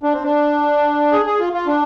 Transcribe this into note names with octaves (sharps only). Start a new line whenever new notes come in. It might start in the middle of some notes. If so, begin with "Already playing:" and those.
D4
C4
D4
G#4
G#4
F4
F4
D4